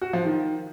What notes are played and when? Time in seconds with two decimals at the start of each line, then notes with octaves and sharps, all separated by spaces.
0.01 F#4
0.13 F3
0.25 D#3